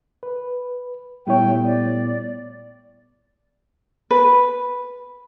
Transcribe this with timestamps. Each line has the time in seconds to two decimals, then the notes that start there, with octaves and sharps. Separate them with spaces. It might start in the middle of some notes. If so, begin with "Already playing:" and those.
0.23 B4
1.27 A#2 G3 A3 B3 E4 C#5 G5
1.64 D5
4.11 B4